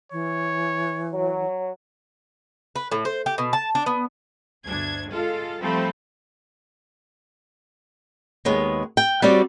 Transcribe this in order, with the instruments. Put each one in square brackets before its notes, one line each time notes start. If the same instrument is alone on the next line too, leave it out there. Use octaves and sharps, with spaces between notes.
[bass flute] E3 [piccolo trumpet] C#5
[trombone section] F#3
[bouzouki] B4
A2
C5
G4
B2
A5
D4
B3
[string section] G1 D2 D4 G#6
G#3 F4 A4 F5
F3 G3 A3 C4 A4 B5
[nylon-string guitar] D#2 G#3 B3 C#5
G5
G3 C4 F#4 C#5 D5